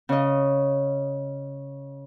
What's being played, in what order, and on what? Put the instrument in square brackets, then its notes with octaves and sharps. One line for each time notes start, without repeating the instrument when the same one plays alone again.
[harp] C#3 D#5